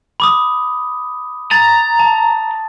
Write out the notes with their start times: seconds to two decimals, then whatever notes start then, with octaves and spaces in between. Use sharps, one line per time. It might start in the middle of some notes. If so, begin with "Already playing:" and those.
0.20 B5 D6 D#6
1.51 A#5 A6
2.00 A5